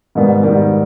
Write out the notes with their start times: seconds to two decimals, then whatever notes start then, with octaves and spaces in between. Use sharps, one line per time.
0.15 G#2 D#3 G3 B3
0.44 G#2 D#3 G3 B3